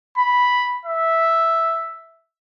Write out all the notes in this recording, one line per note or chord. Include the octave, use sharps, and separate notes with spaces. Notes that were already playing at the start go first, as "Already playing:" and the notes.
B5
E5